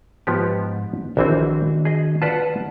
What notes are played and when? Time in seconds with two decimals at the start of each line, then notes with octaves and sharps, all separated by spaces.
0.27 G#2 F3 B3 G4
1.17 A#1 D#3 E3 C4 D4 F#4
1.85 G#4 D#5
2.22 F4 B4 D5 F#5 A5